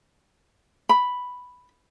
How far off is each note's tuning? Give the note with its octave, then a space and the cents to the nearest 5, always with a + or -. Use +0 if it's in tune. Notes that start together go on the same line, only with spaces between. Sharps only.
B5 +0